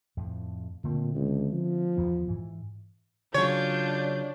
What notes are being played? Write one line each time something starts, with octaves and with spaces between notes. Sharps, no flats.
F2 A2 F3
A#2 D3 A3 C4
C#2
F3
E2 D#3 B3
G#2 E3
C#3 F#3 D4 F4 C#5 G6